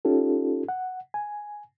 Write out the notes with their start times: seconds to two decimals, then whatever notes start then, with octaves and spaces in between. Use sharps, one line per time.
0.05 C#4 D#4 F4 G4 A4
0.69 F#5
1.14 G#5